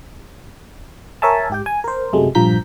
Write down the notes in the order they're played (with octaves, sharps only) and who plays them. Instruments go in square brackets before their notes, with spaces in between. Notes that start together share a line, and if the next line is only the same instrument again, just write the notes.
[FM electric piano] A#4 C#5 E5 G#5 A5
G#2 G4 G5
G#5
A#4 C5
F#2 C3 F#3 G#3 A3
A#1 G2 F3 A#5 G6 B6